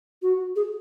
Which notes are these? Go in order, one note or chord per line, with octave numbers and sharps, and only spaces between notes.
F#4
G#4